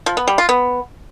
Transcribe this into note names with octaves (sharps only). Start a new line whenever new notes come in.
F3
B3
G3
F4
B3